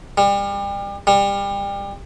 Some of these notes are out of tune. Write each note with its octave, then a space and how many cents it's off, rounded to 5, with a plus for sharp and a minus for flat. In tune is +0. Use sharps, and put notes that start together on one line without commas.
G3 +35
G3 +30